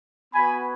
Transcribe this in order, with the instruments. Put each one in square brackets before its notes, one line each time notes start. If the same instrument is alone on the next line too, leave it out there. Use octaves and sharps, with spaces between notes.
[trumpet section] B3 F#4 G#5 B5